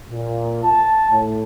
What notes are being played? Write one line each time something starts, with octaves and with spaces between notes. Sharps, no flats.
A#2
A5
A2